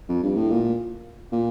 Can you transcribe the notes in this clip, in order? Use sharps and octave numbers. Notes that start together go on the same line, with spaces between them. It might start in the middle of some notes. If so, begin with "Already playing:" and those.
F2
G2
A2
A#2
A#2